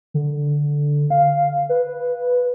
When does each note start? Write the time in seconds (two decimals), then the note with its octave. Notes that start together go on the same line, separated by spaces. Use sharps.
0.14 D3
1.10 F5
1.69 B4